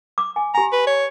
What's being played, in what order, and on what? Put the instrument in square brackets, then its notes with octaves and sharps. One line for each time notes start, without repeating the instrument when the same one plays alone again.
[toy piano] D6
G#5
[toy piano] G4 G#5 [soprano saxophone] A#5
[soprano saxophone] B4
C#5